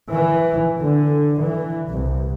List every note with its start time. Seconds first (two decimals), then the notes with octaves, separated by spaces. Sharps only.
0.10 E3
0.79 D3
1.40 E3
1.88 C2